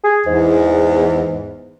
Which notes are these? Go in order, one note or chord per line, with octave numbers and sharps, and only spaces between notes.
G#4
E2 G#2